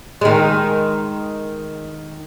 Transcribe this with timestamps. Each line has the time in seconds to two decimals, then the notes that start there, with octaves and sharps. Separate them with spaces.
0.21 D#3 G#3